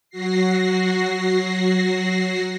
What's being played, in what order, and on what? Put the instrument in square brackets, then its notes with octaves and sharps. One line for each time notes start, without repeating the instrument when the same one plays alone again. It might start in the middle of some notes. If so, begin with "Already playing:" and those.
[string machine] F#3 F#4 A#6 C7